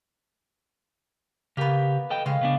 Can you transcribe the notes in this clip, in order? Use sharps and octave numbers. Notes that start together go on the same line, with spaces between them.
C#3 A#3 B3 G4
A4 D#5 G5
C#3 G#3 F5
C#3 B3 D4